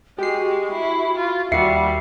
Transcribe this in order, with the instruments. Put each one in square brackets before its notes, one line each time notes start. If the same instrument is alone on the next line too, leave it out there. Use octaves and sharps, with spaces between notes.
[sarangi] G#3 [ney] F#4 [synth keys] G4 C7
[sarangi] E4
F4
[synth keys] D#2 F#4 [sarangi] G3 [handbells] E5 C7 C#7